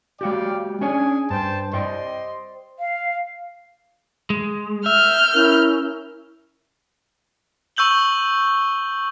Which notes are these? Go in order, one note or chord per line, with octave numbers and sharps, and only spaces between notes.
G#3 F#4 G4 D5 F5 G5
C#4 D4 G#4 C#5 G#5
G2 C5 G5 A5
G3 C5 D5 D#5 G5 C6
F5
G#3
E5 F6 G6
C#4 E4 A#4
C#6 E6 G6 F#7 G7